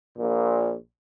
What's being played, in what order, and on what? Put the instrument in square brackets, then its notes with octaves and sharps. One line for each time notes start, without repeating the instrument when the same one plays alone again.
[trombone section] A#1 A#2